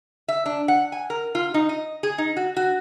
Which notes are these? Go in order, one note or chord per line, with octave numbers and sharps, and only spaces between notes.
E5
D4
F#5
G#5
A#4
F4
D#4
D#5
G#4
D#4
F#4
F#4